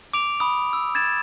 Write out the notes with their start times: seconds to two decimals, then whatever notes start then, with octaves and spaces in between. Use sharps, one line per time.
0.13 D6 D7 F7
0.40 B5 D#6
0.73 E6
0.95 G#6 A6 E7